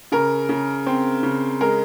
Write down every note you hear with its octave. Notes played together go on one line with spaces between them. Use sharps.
C#3 A#4
C#3
C4
C#3
G#3 A#4